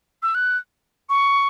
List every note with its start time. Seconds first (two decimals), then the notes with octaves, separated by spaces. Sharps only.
0.23 E6
0.35 F#6
1.09 C#6